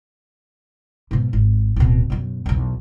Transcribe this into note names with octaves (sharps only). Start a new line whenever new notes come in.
G#2 B2
G#1
D1 B2
F#2 B2
B1 E2